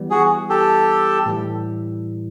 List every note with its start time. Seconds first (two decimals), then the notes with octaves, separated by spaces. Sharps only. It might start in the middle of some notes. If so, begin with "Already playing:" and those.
Already playing: E3 G3 B3
0.11 F#4 G#4
0.50 G4 A4
1.26 A2 E3 G3